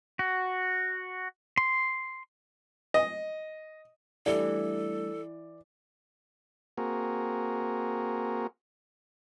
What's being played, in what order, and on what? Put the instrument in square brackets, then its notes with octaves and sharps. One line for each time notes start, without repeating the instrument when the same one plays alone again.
[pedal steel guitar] F#4
C6
[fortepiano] D#5
[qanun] E3 [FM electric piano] G3 A3 D4 [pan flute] A4 [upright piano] D5
[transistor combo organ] A#3 C4 F#4 G#4 A#4